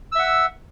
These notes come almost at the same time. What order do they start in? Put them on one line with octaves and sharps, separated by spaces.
E6 E5 F#5